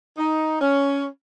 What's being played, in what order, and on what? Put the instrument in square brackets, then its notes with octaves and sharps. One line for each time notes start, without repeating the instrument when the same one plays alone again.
[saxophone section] D#4
C#4